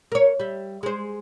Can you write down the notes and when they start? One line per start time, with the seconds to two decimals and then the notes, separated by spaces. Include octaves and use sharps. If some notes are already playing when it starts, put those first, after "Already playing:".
0.12 A#4 C#5
0.40 G3 E5
0.83 G#3 C5